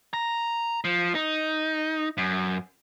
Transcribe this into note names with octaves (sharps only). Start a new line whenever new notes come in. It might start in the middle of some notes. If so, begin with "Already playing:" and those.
A#5
F3
D#4
F#2